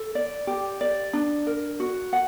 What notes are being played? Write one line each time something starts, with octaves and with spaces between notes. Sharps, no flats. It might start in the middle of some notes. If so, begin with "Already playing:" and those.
Already playing: A4
D5
G4
D5
D4
A#4
F#4
F#5